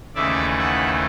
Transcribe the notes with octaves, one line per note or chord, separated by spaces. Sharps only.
D#2 C#3 E3 A3 D5 E5
E5 F#5